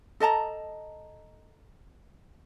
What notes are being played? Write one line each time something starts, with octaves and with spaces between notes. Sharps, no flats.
A4 D#5 A5 A#5